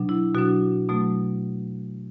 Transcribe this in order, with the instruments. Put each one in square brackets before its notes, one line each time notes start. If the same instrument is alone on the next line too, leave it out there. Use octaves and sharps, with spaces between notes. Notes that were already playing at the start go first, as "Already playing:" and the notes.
Already playing: [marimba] B2 F#3 D4
E4
B2 F#3 D4 F#4
B2 F#3 A3